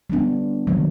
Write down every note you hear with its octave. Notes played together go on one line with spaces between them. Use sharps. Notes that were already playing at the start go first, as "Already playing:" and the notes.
G3 B3 D4
C3 D#3 F#3 A#3